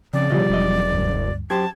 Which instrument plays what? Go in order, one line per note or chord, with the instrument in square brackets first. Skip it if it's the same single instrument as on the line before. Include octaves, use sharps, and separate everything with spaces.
[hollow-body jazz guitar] F2 [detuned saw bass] C#3 [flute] D5
[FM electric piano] B2 F3 G3 [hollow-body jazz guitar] D3 E3 D#5
[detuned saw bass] E1 [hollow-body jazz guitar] F#2 D#5
[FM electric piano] D2 G2
[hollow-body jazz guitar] F#2 G4 C5 [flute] A5 [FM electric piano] G#6